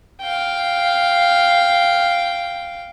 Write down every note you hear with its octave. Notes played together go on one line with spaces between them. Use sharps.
F5 G5